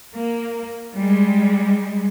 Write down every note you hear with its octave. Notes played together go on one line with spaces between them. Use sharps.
A#3
G3 G#3